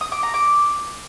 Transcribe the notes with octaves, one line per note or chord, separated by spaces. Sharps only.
D#6
D6
A#5
D6